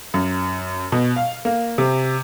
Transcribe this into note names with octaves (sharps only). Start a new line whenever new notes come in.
F#2
B2
F5
A#3
C3